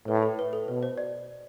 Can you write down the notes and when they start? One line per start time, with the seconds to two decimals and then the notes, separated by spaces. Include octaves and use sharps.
0.08 A2 B4
0.23 A4
0.39 B4
0.53 A4
0.68 B2 B4
0.83 C5
0.98 D5